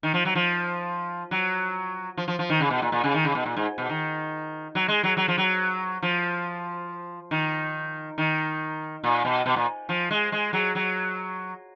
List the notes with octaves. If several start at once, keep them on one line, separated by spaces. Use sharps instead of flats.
D#3
F3
F#3
F3
F#3
F3
F3
F3
D#3
C#3
B2
A#2
A#2
C#3
D#3
C#3
B2
A#2
G#2
B2
D#3
F#3
G#3
F#3
F#3
F3
F#3
F3
D#3
D#3
A#2
B2
B2
A#2
F3
G#3
G#3
F#3
F#3